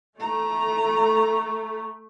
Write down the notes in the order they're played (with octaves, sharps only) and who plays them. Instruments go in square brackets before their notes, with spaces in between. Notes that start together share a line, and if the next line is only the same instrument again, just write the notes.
[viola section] A3 [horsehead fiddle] A#5